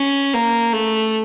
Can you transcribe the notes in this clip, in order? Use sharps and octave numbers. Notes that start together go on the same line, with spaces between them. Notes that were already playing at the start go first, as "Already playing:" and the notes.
Already playing: C#4
A#3
A3